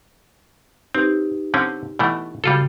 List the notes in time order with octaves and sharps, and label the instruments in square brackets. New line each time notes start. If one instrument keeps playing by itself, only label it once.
[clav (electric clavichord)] C4 [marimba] D#4 G4 B4
[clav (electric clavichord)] D3 C4 C#4
B2 E3 A3
[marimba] C#3 F#4 [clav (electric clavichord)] G3 F4 A4